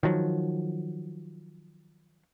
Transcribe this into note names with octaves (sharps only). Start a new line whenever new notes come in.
D#3 F3 F#3